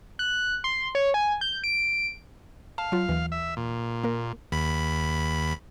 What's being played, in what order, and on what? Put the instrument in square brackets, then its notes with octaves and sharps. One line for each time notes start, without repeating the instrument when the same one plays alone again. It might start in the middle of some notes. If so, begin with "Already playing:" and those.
[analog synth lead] F#6
C6
C#5
G#5
G6
D7
[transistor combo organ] F5 [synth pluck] A5
[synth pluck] F#3 F4
D#2 E3
[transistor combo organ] E5
A#2
[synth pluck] A#3 A#4
[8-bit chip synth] D#2 B5